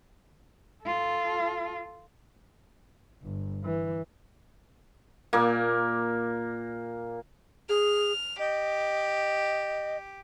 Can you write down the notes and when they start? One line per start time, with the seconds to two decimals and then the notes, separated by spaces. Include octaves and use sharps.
0.84 F4 A4
3.22 G1
3.64 E3
5.33 A#2 A#3
7.69 G#4 F6
8.39 G4 D#5